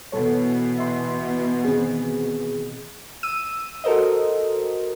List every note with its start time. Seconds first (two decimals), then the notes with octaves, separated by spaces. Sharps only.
0.12 B2 E3 A4 C#5
0.78 E5 C6
1.64 D#3 C4 G#4
3.23 E6 D#7
3.84 F#4 A4 A#4 C5 D#5